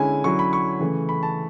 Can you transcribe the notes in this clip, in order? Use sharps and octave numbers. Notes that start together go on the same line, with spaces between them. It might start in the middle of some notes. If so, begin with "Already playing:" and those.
Already playing: D3 G#3 C#4 E4 G#5
D3 F#3 C#4 E4 C#6
B5
C#6
C#3 E3 A3
B5
A5